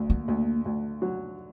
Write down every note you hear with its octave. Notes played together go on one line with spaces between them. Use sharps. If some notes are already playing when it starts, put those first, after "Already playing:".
Already playing: D2 D3
A#3
D2
D2
F#3